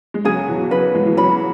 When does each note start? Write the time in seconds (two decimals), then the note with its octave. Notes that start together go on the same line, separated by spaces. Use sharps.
0.14 G#3
0.25 C#3 F#3 G#4
0.48 B2 E3
0.71 C#3 F#3 B4
0.94 E3 G#3
1.06 E3
1.17 C#3 F#3 B5